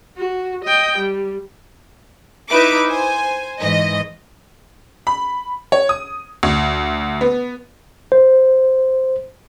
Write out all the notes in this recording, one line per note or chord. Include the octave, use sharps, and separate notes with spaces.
F#4
D#5 G5
G3
D#4 E4 B4 E5 D6
C5 G#5
G#2 E3 D#5
B5
C#5
D#6
D2
B3
C5